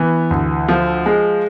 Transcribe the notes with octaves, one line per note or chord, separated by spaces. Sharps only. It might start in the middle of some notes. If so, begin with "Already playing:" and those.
Already playing: E3 B3
D2
F3
G#3